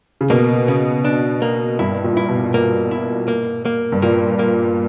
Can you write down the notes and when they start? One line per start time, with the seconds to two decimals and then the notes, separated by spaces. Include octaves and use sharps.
0.21 C#3
0.30 B2 A#3
0.68 C#3
1.05 D4
1.42 A#3
1.79 G2 E4
2.04 A#2
2.17 E4
2.29 B2
2.54 A#3
2.91 E4
3.28 A#3
3.65 A#3
3.92 G2
4.02 A#2 A#3
4.39 A#3